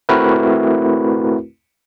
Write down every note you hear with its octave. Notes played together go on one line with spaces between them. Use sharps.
A3 C4 E4 F#4 A#4 B4